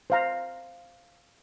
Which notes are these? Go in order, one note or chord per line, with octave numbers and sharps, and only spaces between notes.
C5 F5 A#5